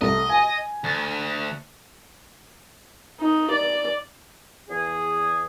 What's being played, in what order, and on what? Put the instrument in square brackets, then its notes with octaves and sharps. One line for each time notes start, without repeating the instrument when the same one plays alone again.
[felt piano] C2 A3 [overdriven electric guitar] D#5
[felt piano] G#5
[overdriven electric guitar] D2
[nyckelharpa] D#4
D5
[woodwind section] E2 G#4